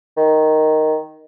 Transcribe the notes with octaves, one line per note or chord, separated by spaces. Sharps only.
D#3